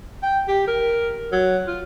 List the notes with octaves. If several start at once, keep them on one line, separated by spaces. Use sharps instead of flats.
G5
G4
A#4
F#3
F4